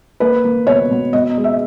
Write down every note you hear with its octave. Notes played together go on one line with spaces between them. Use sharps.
A#3 B4
A#3
B2 C#5
B2
B2 D#5
G#3
E5